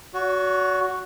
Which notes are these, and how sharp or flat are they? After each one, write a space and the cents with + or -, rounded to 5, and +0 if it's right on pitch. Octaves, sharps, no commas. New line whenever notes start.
F#4 +0 C#5 +45